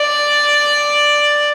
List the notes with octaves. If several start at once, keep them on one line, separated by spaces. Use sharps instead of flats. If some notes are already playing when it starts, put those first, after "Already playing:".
Already playing: D5